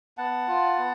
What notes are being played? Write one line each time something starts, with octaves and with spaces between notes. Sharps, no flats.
B3 F#5 A5
F4
B3